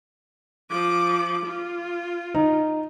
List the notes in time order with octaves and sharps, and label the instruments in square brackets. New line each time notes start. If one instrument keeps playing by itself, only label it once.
[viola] F3 D6
F4
[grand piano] D#4